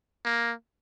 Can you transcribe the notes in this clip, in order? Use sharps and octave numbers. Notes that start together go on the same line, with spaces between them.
A#3